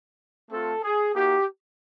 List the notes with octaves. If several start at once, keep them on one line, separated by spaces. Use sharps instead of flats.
A3 C4 F4 A4
G#4
A#3 D#4 F#4 G4